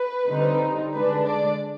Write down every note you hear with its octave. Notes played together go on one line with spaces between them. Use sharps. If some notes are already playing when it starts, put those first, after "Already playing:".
Already playing: B4
D3 G3 C4 D#4
D3 G#3 D4 B4
D5